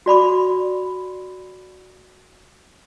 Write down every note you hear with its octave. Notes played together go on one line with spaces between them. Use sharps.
F#4 D5 B5 D6